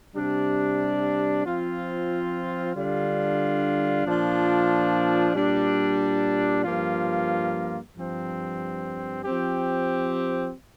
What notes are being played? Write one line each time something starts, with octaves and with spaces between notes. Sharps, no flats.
C3 G3 D4
F3 C4 F4
D3 G3 D4 F4
A#2 F3 D4 F4
A#2 G3 D4
G2 F3 A#3 F4
G2 F3 C4
F3 C4 G4